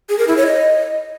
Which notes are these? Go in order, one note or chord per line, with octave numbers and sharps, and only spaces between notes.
G#4
A#4
E4
C#5
D#5